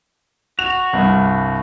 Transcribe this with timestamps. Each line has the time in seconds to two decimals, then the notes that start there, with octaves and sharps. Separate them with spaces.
0.59 F#4 F7
0.93 C2 G2